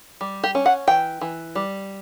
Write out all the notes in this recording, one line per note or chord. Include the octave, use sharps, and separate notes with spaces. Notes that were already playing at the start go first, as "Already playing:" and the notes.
G3
G4
C#4
F#5
E3 G5
E3
G3